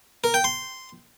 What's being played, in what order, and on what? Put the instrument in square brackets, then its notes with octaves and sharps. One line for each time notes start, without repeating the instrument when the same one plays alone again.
[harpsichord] A#4
G5
C6